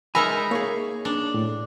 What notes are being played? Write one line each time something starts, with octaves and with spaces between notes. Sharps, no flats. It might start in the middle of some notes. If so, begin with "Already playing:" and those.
G#3 D#4 A#4 E5 G#5 A#5 B5
A#3 G#4 C#5
D4
A2